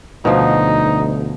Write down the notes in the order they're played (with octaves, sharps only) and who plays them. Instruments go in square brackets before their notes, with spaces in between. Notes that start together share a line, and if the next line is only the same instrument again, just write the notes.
[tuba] D2 [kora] B2 F3 [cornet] D#4